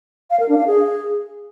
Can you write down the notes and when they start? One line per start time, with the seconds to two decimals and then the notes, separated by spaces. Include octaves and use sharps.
0.31 F5
0.40 A#4
0.49 D4
0.58 F5
0.67 G#4